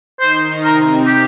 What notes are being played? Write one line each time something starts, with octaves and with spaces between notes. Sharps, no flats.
D#3 D#4 C5
C3 C4 A#4
G4